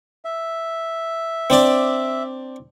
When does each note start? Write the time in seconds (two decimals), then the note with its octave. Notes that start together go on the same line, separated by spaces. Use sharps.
0.25 E5
1.50 C4 D4 D5